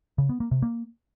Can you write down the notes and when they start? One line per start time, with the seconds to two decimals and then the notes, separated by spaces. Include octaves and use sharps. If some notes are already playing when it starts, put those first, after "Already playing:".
0.18 C#3
0.29 B3
0.40 A#3
0.51 C3
0.62 A#3